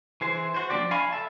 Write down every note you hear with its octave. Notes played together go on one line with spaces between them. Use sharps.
E3 G#4 C5
F#4 C5
F3 A#3 D4 G4 D5
F5 G#5 B5 C#6
A4 E5 A5